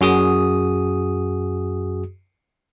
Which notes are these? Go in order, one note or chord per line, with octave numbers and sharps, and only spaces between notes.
F#2 F#4 G#4 D#6